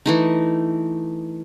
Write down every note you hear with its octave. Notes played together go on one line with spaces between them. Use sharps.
E3 A3 D#4